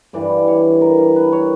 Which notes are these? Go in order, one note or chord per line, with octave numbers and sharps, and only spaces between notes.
G2 E3 G3 D5
C#5
A#4
A#4
B4
C#5